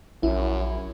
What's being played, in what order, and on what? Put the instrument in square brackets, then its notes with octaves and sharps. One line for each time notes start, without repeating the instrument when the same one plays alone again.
[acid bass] A#1 [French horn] F#2 [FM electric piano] E4